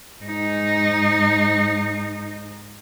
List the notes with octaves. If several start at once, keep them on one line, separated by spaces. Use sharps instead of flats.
G#2 D#4